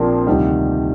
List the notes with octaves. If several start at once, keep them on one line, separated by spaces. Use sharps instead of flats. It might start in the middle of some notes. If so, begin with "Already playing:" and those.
Already playing: A#1 A#2 F3 A#3 C4 D4 C5 D5
D2 C3 D#3 G3